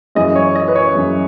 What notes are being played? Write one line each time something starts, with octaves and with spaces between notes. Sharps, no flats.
F#2 E3 G#3 D#5
C#5
D#5
B4
C#5
F#2 E3 G#3